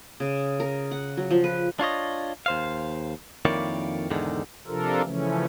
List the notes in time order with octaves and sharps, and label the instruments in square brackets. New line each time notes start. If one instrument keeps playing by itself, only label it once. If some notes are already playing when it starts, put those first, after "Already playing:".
[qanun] C#3
A#4
F#5
F#3
F3
B4
[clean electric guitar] D4 F4 C#5 D#5
D#2 C5 F5
F2 D#3 A#3 E4 C#5 D5
E2 G#2 D3 D#3
[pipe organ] C3 F3 D4 F4 A4 A#4
C#3 E3 F3 A3 C#4